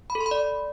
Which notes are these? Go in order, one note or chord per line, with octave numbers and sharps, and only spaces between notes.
B5
A4
C6
B5
D5